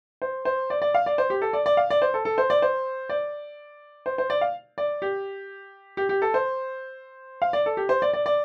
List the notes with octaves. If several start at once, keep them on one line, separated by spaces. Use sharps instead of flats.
C5
C5
D5
D5
F5
D5
C5
G4
A4
D5
D5
F5
D5
C5
A4
A4
C5
D5
C5
D5
C5
C5
D5
F5
D5
G4
G4
G4
A4
C5
F5
D5
A4
G4
C5
D5
D5
D5